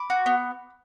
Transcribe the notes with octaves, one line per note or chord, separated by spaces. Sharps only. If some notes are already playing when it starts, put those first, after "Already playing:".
Already playing: B5 D6
F#4
B3